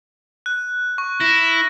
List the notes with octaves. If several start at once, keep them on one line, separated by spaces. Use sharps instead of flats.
F#6
C#6
E4 A#6